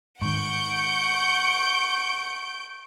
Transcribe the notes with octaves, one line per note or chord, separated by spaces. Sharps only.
G#2 D#3 F#5 C#6 G6 C#7 D7